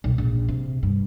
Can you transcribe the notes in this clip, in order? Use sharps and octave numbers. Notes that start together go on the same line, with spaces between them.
B1
A#1
C3
G2